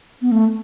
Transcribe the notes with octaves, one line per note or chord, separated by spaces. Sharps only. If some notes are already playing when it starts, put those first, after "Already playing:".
B3
A3